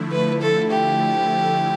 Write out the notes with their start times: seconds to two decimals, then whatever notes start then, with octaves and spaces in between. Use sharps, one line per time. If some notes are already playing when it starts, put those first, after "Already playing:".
Already playing: D3 F3 A3 E4
0.12 B4
0.41 A4
0.71 G4